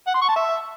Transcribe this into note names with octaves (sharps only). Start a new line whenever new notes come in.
F#5
C6
C#6
A5
E5